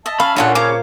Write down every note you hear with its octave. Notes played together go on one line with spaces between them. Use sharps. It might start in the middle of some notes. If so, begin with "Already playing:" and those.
D#5 E5 A5
C#4 F5 B5
A#2 C#3 D4 E4 F4 A4 F#5
C5 C#5 F5 A#5 D6